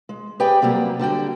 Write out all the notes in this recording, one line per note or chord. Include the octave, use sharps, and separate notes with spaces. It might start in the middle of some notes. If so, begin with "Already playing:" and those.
G#3
G4 G#4 B4 D5 G5
C3 F#3 G3 A#3
D3 G3 F#4 G5